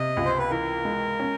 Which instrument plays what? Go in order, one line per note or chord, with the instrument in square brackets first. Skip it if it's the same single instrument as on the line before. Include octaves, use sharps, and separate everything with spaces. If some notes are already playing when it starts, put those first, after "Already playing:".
Already playing: [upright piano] C3 [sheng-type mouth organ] D#5
[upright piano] C#2
[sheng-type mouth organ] C5
B4
[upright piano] E3 [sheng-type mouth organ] A#4
[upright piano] G#3
C#4